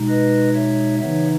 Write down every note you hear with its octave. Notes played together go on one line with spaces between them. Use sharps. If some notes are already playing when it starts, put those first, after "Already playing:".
Already playing: B2 G#3 D#4
B4 D#5
C#5 E5
C#3 E3 B3 D#4 C#5 E5